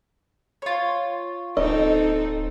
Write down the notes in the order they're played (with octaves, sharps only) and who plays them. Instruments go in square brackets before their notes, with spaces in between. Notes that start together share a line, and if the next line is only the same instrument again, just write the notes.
[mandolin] F4 C#5
[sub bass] D1 [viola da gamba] C4 D#4 A4 [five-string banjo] D#5